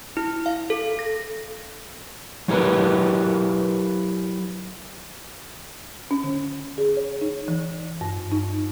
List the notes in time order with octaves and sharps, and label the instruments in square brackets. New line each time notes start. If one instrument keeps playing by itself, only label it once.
[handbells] E4
F5
A4
A#6
[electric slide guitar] F#3 E4 G4 A#4 B4
[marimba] C#4
D3
G#4
C#5
D#4
E3
G2
D#4